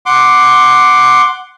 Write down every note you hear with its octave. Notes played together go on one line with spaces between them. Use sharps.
F#5 C6 D6